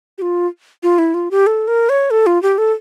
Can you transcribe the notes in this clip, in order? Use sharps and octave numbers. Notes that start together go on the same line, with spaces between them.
G4
F4
F4
E4
F4
G4
A4
A#4
C#5
A4
F4
G4
A4